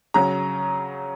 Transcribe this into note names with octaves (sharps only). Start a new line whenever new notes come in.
C#3 F#3 C#4 A#5